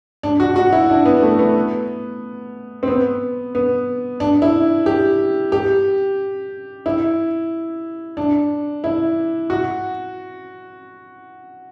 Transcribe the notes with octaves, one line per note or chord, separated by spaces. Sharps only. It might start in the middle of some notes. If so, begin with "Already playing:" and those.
D4
F#4
F#4
E4
D4
B3
A3
B3
C4
B3
B3
D4
E4
G4
G4
E4
D4
E4
F#4